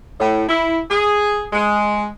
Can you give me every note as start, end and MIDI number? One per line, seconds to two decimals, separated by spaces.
0.19 0.43 45
0.48 0.78 64
0.89 1.44 68
1.52 2.06 56